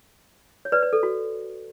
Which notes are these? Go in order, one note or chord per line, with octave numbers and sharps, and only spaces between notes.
C#5
B4 D5
B4
A4
F#4